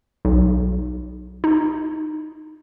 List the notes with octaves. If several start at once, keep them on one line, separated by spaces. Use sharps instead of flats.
B1
D#4